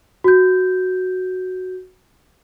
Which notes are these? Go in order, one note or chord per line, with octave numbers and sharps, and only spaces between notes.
F#4 G6